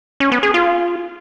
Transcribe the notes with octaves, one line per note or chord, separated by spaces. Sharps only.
C#4
B3
G#4
F4